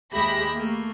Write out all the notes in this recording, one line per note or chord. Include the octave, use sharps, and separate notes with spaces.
D#2 G#3 G4 E5 B5 A#6
A3 A#3